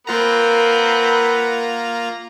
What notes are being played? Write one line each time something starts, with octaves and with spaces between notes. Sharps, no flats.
A#3 C4 F4 A#4 B4 F#5 A#5